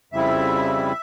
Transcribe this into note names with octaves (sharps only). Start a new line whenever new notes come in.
F2 C#3 G3 C4 E4 E5